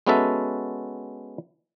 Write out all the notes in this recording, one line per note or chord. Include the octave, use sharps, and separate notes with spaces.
G#3 B3 C#4 F#4 A4 E5